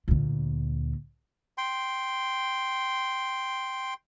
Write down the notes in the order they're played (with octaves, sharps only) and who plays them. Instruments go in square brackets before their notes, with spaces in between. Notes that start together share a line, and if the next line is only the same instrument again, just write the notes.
[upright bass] D2 A#2
[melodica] G5 C6